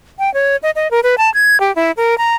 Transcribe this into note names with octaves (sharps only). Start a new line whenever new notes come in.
G5
C#5
D#5
D#5
A#4
B4
A5
G#6
G4
E4
A#4
A#5